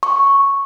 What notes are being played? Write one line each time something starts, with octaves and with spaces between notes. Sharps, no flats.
C#6